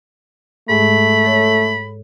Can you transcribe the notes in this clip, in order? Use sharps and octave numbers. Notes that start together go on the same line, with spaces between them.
G#2 G#3 A3 B5
A4 C#5